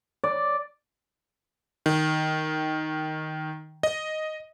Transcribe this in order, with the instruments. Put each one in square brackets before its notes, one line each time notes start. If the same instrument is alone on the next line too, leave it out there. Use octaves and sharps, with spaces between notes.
[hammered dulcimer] D5
[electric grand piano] D#3
D#5